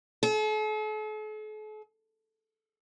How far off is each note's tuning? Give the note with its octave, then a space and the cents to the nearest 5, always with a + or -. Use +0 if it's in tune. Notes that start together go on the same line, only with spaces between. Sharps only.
A4 -45